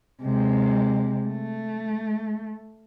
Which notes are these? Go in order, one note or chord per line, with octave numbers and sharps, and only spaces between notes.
C3 G#3
A3